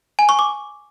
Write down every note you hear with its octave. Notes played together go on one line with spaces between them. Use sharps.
G#5
C#6
D6